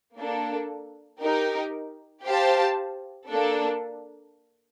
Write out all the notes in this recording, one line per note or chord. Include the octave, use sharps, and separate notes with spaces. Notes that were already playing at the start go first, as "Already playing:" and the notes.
A#3 D4 A4
D#4 G4 A#4
G4 C5 F5 A5
A#3 D4 A4